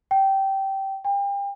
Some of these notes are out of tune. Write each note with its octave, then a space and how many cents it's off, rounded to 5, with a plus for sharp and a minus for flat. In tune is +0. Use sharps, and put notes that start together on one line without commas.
G5 -15
G5 +35